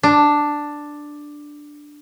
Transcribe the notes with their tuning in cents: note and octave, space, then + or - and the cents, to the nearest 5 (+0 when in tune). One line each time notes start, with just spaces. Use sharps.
D4 +5